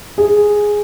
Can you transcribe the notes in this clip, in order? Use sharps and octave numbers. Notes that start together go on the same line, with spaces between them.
G#4